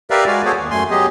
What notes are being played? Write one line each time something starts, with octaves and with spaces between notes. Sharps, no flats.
G4 A#4 B4 D5 E5 F5
G#3 F#4 D5 F5 G#5
B3 F#4 G#4 A4 C5 C#5
D#2
F#2 A3 G#5 C6
F#3 B3 G4 G#4 D#5